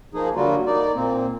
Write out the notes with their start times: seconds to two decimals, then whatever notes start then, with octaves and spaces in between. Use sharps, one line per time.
0.14 F3 A#3 D#4 G#4
0.35 D3 F#3 G3 A#3 F4 F#4
0.66 A#3 D#4 D5
0.95 A#2 A#3 C4